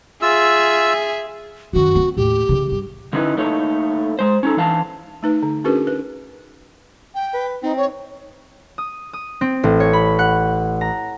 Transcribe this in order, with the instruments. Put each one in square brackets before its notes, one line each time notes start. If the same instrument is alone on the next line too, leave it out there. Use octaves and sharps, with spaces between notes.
[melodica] F4 E6 [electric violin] G#4 E5
[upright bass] F#2 D#3 [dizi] F#4
[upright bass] B3 C4
[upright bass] D#2 A2 [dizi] G4
[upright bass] C#3 E3
G2
[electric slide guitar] D3 C#4 D#4 E4 B4
A3 A#3 D#4 A4 C#5
G#3 C5
C#4 D#4 A4
E3 D4 F5 A5
[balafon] A3 D#4 B4
D3
C#4 D4 F#4 G#4 A#4 B4
B4
[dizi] G5
[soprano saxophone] B4
[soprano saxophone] C4 [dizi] D#4
[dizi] C#5
[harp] D#6
D#6
C4
A1
C#5
B5
F#5
A#5